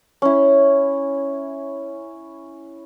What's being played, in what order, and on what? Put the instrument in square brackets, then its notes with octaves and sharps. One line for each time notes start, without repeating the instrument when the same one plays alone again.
[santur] C#4 E4